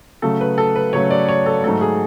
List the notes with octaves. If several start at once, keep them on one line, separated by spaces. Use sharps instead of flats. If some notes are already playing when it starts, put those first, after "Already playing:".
C#3 F#3 A3 A4
B4
A4
B4
C#3 F#3 A3 C#5
D5
C#5
A4
G#2 F#3 A3 A4
G#4